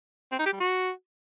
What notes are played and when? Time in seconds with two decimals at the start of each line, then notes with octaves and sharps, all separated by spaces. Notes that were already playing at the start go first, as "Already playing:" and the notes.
0.32 C4
0.39 D#4
0.46 G4
0.53 G3
0.60 F#4